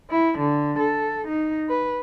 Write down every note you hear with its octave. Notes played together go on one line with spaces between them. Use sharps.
E4
D3
A4
D#4
B4